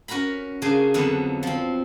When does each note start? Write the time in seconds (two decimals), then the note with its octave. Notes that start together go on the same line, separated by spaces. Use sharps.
0.08 C#4 F#4 A#4 A#5 B5
0.62 C#3 A#3 D4 G#4
0.94 F2 D3 F#3 B3 F#5
1.43 F3 C4